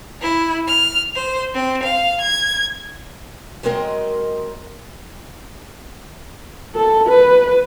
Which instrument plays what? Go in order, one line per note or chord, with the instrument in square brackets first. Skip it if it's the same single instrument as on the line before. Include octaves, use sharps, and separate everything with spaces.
[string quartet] E4
F6
C5
C4
F5
G#6
[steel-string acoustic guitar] F#3 G#3 C4 A#4 D#5
[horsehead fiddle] A4
B4